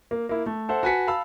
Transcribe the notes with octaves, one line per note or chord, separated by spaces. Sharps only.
A#3
A#3 E4
A3
A4 C5 E5 F#5
F#4 B4 G#5 A5 B6 C#7
F5 A5 B5 E6